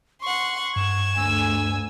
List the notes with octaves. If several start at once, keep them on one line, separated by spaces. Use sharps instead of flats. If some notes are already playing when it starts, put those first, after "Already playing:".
F#5 C6 C#6
G2 G#6 E7
D2 G#5 E6